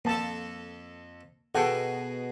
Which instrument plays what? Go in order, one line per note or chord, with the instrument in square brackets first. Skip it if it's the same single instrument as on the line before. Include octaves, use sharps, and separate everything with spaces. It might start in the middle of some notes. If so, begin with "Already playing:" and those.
[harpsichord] F2 A4 [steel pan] A#3 A5
[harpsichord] B2 G#4 [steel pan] A4 F#5 G5